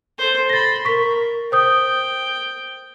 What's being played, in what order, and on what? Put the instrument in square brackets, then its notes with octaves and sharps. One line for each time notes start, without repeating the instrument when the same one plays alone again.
[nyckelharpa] A4 C5
[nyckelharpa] B5 C6 [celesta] A6 A#6
[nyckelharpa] A#4 [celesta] C#6 B6
[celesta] C5 D#6 G6 [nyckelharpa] G5